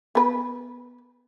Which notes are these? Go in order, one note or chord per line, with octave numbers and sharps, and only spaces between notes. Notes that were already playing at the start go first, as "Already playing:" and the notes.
B3 B4